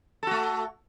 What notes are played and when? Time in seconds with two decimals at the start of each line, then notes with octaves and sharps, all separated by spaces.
0.23 A4
0.27 F#4
0.31 A3